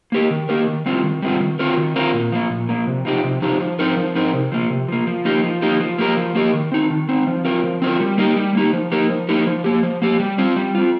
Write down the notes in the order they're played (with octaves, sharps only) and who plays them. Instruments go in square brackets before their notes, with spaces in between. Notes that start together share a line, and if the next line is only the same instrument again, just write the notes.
[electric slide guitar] A#3 G4 A#4
D#3
A#3 G4 A#4
D#3
G3 C4 F4
D#3
G3 C4 F4
D#3
C4 F4 A#4
D#3
C4 F4 A#4
A#2
F3 A#3
A#2
F3 A#3
C3
F3 D#4 G4
C3
F3 D#4 G4
F3
C4 D#4 A#4
F3
C4 D#4 A#4
C3
F3 A#3
C3
F3 A#3
F3
A#3 D#4 G4
F3
A#3 D#4 G4
F3
A#3 G4 A#4
F3
A#3 G4 A#4
D#3
C4 D#4
D#3
C4 D#4
F3
C4 F4 A#4
F3
C4 F4 A#4
G3
A#3 D#4 G4
G3
A#3 D#4 G4
F3
A#3 D#4 G4 A#4
F3
A#3 D#4 G4 A#4
F3
A#3 G4
F3
A#3 G4
G3
C4 F4
G3
C4 F4